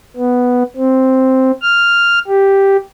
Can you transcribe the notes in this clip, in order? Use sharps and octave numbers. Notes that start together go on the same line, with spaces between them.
B3
C4
F6
G4